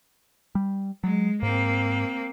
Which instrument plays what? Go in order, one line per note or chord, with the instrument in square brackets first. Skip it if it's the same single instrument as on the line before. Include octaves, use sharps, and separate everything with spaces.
[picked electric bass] G3
[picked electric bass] F#3 [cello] G#3
[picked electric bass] G#2 [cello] A#3 C4